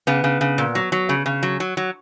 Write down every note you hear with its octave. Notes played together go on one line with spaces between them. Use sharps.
C#3 B3
C#3
C#3
A#2
F#3
F#3
C#3
C#3
F#3
F#3
F#3